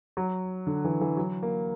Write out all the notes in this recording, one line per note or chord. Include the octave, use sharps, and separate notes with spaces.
F#3
D3
E3
E3
F#3
A#3